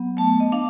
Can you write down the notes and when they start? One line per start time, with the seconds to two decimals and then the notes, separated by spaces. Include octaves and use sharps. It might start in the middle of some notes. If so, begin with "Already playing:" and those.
Already playing: F#3 B3
0.17 A3 A5
0.40 D#5
0.52 D4 F5